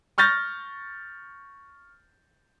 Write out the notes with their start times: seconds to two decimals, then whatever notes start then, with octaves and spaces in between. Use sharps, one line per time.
0.18 C#6 F6 G6 A6 A#6